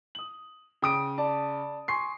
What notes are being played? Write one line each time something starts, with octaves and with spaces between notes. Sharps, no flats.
D#6 F#7
C#3 G5 D#6 D7
D5 A5
G#5 C6 C#6 C7